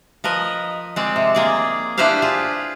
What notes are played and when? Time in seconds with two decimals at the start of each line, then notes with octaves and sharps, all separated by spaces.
0.24 F3 A#4 B4 D#5
0.96 G#3 C4 D5
1.16 C3
1.35 A#3 G#4 D5
1.98 D4 E4 G4 B4 C5 F5
2.22 F4 G#4